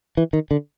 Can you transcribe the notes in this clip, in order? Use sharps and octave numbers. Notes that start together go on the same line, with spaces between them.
E3
D#3
D3